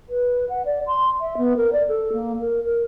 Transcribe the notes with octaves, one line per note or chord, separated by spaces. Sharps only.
B4
F#5
D5
C6
E5
B3
A#4
D5
A4
A#3
A#4
A#4